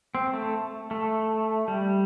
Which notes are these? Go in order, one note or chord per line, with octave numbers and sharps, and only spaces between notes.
C4
A3
A3
G3